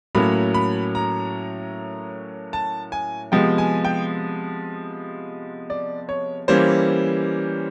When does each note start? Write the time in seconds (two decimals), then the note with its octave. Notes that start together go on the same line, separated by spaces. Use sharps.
0.15 A2 F#3 A#3 C#4 B5
0.54 B5
0.95 A#5
2.53 A5
2.92 G#5
3.32 C3 F3 G#3 B3 G5
3.58 G#5
3.85 G5
5.70 D5
6.09 C#5
6.48 E3 G3 A#3 C#4 C5